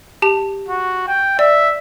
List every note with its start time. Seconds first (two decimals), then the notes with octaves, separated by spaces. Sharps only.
0.22 G4 A5
0.68 F#4
1.08 G5
1.39 D5 E5